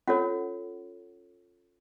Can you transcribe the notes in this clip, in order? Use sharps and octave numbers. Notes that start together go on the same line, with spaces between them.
C#4 F4 A4 C#5 F#5